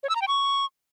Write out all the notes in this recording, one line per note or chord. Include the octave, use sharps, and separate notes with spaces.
C#5
E6
A#5
G5
C#6